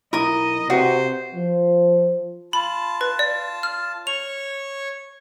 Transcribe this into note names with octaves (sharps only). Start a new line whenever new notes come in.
B1 E4 A#4 D#5 D#6
C3 F#4 G4 B4 C5 D5
F3
F4 A5 B5
B4
D5
F6
C#5 C#6 F7